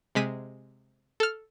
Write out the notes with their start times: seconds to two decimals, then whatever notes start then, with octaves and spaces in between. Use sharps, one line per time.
0.15 C3 G#3 B6 D#7
1.20 A4 F6